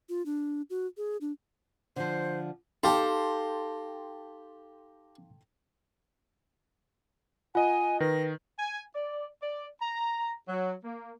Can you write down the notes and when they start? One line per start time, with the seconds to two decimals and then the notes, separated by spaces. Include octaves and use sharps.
0.09 F4
0.26 D4
0.70 F#4
0.97 G#4
1.21 D4
1.96 D3 F3 C5
2.83 D#4 G4 A4 F5 G5 A5 A#5 C6
7.55 F4 D#5 F#5 G#5
8.00 D#3 B4 A#6
8.59 G#5
8.95 D5
9.41 D5
9.81 A#5
10.48 F#3
10.84 A#3